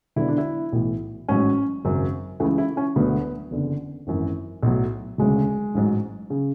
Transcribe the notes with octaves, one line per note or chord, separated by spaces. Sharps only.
E1 E2 D3 F#3 E4
D4
E4
B1 A2 E3
A1 G#2 F#3 C#4
G#1 F#2 C#3 F#3
C#2 C#3 E3 A3
E4
C#4
E1 D2 D3 F#3 B3
F#1 E2 D3
G#1 F#2 E3
B1 A2 F#3
E1 D2 C#3 F#3 G#3
A1 G#2 F#3
C#3